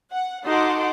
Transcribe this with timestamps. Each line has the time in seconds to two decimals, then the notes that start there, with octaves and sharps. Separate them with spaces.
0.11 F#5
0.45 D#4 F#4 A4 F#5 C6 D6